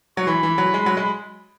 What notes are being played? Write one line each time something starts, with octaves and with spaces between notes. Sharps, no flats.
F#3 C#6
E3 B5
E3
F#3
G#3
F#3
G#3